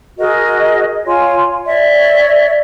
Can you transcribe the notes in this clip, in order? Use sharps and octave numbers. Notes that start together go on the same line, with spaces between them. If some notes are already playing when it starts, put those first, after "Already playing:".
F#4 G#4 A#4 D#5
F4 C#5 G#5 C6
C#5 D5 E5